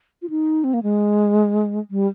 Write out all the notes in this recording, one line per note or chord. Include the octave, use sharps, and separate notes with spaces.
F4
D#4
C4
A#3
G#3
G3